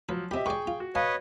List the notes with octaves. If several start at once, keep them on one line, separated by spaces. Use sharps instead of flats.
F3 F#3 B4
C4 G4 D#5 E5 B5
G#4 B4 D5 G5 C#6
F4
F#4
B4 C#5 D#5 F5 A5